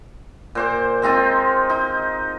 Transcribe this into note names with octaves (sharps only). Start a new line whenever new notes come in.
A#2 C5 D6
G#3 C4 D#4 F4
D#4